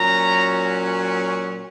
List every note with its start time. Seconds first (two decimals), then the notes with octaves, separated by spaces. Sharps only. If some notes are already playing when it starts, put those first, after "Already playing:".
Already playing: A#2 F#3 C#4 A#5